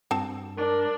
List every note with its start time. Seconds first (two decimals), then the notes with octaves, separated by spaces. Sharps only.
0.11 G2 C4 F#4 A5
0.57 D4 A#4